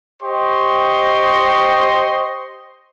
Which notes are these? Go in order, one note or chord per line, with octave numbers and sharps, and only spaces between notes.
G4 C5 D#5 C6 C#6